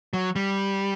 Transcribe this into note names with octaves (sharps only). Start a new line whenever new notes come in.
F#3
G3